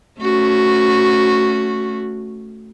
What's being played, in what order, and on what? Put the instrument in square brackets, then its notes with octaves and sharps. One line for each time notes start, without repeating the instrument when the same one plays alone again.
[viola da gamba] A3 C#4 F#4